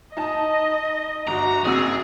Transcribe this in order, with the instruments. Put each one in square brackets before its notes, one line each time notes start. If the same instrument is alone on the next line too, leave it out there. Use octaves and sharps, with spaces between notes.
[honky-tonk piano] D#4 A5 [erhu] D#5
[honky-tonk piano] G1 [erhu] F#4 [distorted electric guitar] A#5
[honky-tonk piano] F#1 C4 E6 [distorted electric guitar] G#4